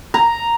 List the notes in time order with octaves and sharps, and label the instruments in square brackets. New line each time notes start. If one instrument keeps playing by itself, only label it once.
[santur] A#5